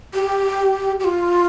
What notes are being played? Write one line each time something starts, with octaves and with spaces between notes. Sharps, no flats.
G4
G4
F4